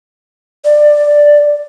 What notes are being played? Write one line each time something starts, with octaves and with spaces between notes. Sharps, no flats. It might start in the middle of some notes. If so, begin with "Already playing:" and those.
D5